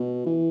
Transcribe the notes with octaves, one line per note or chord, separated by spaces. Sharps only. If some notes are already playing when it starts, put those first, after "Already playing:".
Already playing: B2
E3